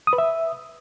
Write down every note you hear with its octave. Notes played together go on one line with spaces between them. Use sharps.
D#6
B4
E5